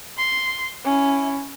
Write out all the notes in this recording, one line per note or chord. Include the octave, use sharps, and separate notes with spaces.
C6
C#4 E4